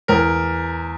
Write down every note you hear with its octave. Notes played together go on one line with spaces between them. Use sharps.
E2 A#4